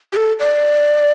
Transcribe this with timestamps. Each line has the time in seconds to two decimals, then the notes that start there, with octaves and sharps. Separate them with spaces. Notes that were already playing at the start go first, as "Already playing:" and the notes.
0.13 G4
0.16 A4
0.40 D5